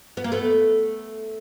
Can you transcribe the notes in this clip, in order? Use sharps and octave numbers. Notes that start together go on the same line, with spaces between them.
B3
A#3
A3 B3